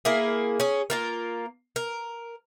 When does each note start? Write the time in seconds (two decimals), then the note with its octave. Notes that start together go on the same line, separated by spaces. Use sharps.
0.05 A#3 E4 G#4
0.60 C#4 G#4
0.90 A#3 F4 A#4
1.76 A#4